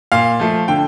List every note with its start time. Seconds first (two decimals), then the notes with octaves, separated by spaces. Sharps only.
0.12 A#2 F5
0.40 F3 A3
0.68 D3 G5